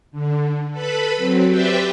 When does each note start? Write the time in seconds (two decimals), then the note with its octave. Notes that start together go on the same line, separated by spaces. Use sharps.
0.12 D3
0.71 A4 B4 B5
1.16 F#3 C4
1.47 G4 B4 C5 D5 E5 G5